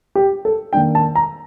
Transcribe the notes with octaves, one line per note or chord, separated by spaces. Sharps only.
G4
A4
D#3 A#3 D4 G5
A5
A#5